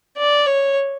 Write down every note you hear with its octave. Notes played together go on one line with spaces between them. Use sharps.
D5
C#5